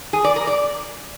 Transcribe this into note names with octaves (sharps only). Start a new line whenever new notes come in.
G#4
D5
A#4
D5